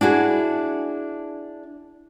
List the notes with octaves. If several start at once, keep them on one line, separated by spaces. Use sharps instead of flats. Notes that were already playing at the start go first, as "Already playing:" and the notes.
D4 E4 F#4 G#4